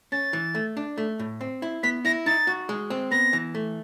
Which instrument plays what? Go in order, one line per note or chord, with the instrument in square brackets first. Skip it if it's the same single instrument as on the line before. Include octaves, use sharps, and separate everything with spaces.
[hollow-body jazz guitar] C#4 [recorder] A6
[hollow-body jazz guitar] E3
A3
D4
A3
A2
C4
E4
[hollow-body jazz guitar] B3 [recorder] B6
[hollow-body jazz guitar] E4 [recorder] A#6
[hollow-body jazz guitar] D#4 [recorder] A6
[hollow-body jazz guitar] F#4
G#3
C4
[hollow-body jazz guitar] B3 [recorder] A#6
[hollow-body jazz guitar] E3
A3